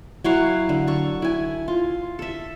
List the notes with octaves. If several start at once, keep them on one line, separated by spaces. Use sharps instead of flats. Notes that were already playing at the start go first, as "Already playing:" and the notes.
F#3 E4 F#4 F5
D3
A4 C#6
E4 G#5
F4
A4 E5